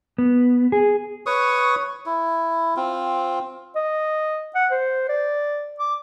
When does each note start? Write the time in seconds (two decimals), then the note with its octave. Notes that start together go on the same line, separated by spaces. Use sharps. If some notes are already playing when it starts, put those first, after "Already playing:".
0.18 B3
0.72 G#4
1.26 B4 C#5 C#6 D#6
2.06 E4
2.76 C4 F4
3.75 D#5
4.55 F#5
4.71 C5
5.09 D5
5.79 D6